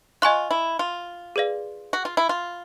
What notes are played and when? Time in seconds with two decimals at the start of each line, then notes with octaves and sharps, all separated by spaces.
0.22 F4 D#5 G#5 C#6 F#6
0.50 E4
0.79 F4
1.36 G#4 B4 D5 F5
1.93 F#4
2.05 F4
2.17 E4
2.29 F4